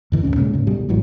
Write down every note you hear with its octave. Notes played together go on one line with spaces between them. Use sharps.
F#2 D3 E3
A1 D#2 A2 C#4
A#2 C#3 G#3
G#2 C#3
D1 B2 G3
A1 G#2 E3 F#3